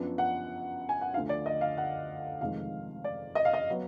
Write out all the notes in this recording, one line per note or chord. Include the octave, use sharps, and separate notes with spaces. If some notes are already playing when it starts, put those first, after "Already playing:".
Already playing: F#2 F3 B3 D4
F#5
G#5
F#5
D2 D3 F3 F5
D5
D#5
F5
F#5
F1 F2 D#3 G#3 F5
D5
D#5
F5
D#5
F#3 B3